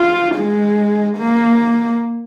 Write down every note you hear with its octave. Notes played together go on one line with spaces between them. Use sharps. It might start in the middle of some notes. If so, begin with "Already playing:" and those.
Already playing: F4
G#3
A#3